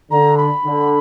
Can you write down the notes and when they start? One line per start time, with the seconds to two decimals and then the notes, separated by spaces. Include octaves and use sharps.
0.11 D3 A#5
0.37 B5
0.65 D3